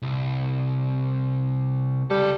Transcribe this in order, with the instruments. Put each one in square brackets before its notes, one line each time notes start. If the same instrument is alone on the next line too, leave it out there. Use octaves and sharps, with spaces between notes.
[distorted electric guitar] C2
[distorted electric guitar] C#2 A4 [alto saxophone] G3